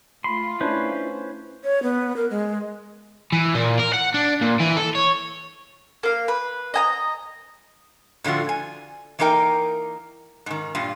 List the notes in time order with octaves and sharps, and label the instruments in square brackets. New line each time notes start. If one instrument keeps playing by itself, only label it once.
[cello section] A3 F4 [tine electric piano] B5 [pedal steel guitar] C6
[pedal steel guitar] C#4 B4 C5 [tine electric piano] D4 E4
[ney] C#5
B3
A#4
G#3
[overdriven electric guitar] E3
A#2
A#4
F#5
D4
A#2
E3
A4
C#5
[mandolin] A#3 F5
B4
D#5 G#5 A#5
[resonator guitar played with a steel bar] A2 D3 F3 F4 F#4
G#5
E3 A#3 D#4 A#4 G5
G#2 D#3
G2 A#2 F4